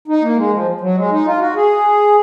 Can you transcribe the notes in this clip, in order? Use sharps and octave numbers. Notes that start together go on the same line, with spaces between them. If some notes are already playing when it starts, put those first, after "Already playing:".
D#4
A#3
G#3
F3
F#3
G#3
D#4
F4
F#4
G#4